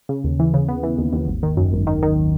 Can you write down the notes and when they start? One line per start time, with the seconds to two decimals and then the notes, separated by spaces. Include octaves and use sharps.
0.09 C#3
0.24 D#2
0.39 E3
0.54 C#3
0.68 B3
0.83 E3
0.98 D#2
1.13 D#2
1.28 G#1
1.43 D#3
1.57 F#2
1.73 G#1
1.87 D#3
2.03 D#3